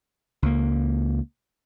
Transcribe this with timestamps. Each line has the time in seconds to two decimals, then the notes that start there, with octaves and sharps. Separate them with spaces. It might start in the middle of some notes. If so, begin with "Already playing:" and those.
0.42 C#2 A#3